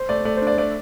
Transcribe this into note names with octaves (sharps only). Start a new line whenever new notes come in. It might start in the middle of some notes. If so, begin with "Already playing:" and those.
Already playing: C5
A3 D5
A3 D5
C5
D4
D5
A3 D5